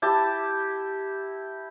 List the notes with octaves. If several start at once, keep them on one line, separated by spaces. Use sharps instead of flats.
E4 G4 A5